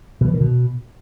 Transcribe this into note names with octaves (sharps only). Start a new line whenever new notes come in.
B2
E3
D#3
B2